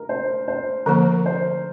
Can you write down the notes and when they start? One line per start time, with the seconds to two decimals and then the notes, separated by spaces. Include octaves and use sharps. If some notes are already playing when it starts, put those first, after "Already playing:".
Already playing: A#4
0.09 C5
0.48 C5
0.86 D3 F3 A#3 A#4
1.26 C5